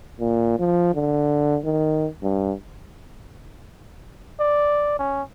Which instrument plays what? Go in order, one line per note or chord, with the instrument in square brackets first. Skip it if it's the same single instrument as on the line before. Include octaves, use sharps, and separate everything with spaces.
[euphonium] A#2
F3
D3
D#3
G2
[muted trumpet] D5
C#4